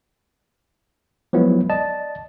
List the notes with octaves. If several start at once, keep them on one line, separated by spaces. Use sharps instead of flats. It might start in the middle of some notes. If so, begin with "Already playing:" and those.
F3 F#3 G#3 B3 E4
D5 D#5 A5